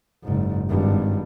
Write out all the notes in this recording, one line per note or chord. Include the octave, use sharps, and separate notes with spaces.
F#1 G#2
G#1 G2